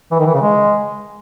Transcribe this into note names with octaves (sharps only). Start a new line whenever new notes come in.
E3
D#3
E3
C#3
G#3